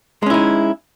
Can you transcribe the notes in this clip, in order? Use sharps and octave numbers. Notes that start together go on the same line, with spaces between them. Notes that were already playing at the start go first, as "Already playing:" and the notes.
G#3 C#4 D#4 E4